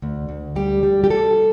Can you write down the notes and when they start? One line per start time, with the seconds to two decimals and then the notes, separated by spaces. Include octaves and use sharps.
0.02 D2
0.29 D2
0.56 G3 G4
0.83 G3
1.04 G4
1.10 G3 A4